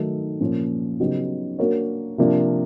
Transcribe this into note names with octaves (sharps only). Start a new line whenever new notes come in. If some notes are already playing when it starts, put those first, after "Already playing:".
Already playing: D#3 F#3 A3
A#2 F3 A#3 C#4
C#3 F#3 B3 D#4 G4
A#3 D4 F#4 A#4 C#5
C3 F3 A#3 D4